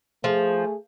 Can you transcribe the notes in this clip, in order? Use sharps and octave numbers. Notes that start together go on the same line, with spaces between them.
F3 A3 G#4